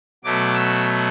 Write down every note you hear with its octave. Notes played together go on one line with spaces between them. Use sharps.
B2 F#3 A3 D6
E6